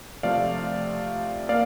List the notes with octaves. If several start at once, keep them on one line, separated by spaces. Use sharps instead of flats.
C3 F3 A3 D5 F5
A#3 D5 F5